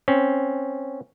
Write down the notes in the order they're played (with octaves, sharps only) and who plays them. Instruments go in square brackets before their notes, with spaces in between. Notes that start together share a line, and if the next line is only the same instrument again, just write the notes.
[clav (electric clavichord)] C4 C#4